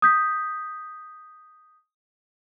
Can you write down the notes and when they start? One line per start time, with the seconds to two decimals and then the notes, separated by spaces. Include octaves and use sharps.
0.02 D#6 G6 B6